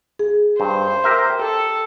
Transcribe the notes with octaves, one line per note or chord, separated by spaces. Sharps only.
G#4
G2 C5
G4 A#4 E5
G4 A4